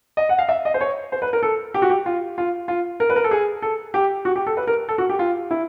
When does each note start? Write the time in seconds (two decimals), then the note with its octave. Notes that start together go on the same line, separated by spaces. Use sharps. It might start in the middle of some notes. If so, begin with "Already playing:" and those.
0.17 D#5
0.29 F#5
0.39 F5
0.49 E5
0.65 D#5
0.74 C5
0.81 C#5
1.12 C5
1.22 B4
1.33 A#4
1.42 A4
1.74 G4
1.82 F#4
1.90 G4
2.06 F4
2.38 F4
2.68 F4
3.00 A#4
3.10 B4
3.16 A#4
3.24 A4
3.31 G#4
3.62 A4
3.94 G4
4.25 F#4
4.36 G4
4.47 A4
4.57 B4
4.67 A#4
4.88 A4
4.98 F#4
5.09 G4
5.19 F4
5.51 E4